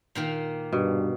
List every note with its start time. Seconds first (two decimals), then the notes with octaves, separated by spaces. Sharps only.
0.15 A#2 D#3 A#3
0.72 G2 B2